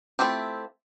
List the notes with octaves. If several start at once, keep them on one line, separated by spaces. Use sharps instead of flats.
A3 C4 E4 F4 G4